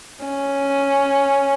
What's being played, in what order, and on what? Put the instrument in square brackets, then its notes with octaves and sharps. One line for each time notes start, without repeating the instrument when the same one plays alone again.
[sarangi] C#4